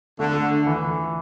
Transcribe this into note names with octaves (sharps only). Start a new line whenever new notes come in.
D3 A3
E3